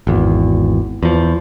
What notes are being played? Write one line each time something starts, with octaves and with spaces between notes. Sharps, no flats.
G#1 E2
E2 F3